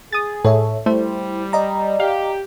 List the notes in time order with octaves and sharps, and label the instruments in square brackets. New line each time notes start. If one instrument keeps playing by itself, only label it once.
[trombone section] G#4 [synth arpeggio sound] D#6 A6
[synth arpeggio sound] A2 [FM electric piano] A4 C#5 E5
[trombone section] G3 [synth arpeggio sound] A3 [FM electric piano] E4 C5
[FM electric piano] D5 D#5 A#5
[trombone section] G4 [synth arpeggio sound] F5